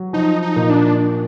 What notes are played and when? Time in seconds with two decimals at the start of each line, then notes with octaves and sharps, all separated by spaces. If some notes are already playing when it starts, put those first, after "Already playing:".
Already playing: F#3
0.13 F3 D#4
0.42 D#4
0.56 A#2
0.70 D4